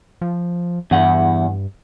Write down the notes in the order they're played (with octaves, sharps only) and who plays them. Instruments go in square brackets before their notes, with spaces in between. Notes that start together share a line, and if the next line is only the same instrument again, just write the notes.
[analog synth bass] F3
[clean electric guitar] E2 F#5 [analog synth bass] G2